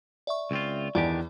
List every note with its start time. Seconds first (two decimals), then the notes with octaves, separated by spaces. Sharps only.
0.27 D5 E5 C#6
0.51 C#2 C4 F4
0.95 E2 D#3 D4 G4 D5